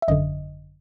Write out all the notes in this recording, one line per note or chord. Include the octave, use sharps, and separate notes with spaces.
E5
G#1 F#2 D3 D#5